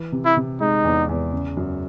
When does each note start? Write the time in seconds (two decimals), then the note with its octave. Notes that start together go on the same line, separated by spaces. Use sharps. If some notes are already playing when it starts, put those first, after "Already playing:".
Already playing: E3
0.12 C3
0.25 E4
0.37 C3
0.61 G#3 D#4
0.84 E2
1.09 E2
1.33 C#3
1.57 F#2